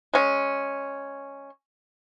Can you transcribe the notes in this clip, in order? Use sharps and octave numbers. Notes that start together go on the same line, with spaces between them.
G#3 C#4